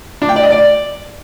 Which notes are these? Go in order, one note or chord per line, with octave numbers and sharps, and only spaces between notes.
D4
G5
D5
D#5
D5